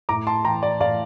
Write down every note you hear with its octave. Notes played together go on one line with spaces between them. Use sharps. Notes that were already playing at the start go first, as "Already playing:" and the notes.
A2 A#5 D6
A5 C6
E3 G5 A#5
D5
A2 D5 F5